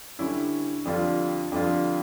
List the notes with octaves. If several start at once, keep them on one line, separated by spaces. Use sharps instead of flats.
D3 G3 C#4 E4
F2 D3 G3 D4 F4
F2 D3 G3 D4 F4